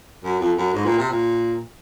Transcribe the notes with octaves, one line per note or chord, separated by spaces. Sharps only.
F#2
F2
F#2
G#2
A#2
C3
A#2